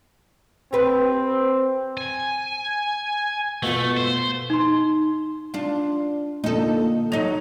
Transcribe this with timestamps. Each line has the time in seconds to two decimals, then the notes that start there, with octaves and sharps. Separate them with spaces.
0.73 C4 G4 B4
1.98 G#5
3.63 B2 A3 F4 B4
3.97 C5
4.50 D#4 C6
5.54 D4 F4
6.44 A#2 D3 D#4 A4
7.12 F#3 D#4 A#6 F7